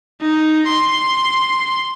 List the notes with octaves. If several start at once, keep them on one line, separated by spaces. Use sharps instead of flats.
D#4
C6